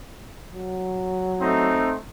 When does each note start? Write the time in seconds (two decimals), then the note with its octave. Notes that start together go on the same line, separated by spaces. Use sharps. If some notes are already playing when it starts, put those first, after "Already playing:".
0.55 F#3
1.41 A3 C4 D#4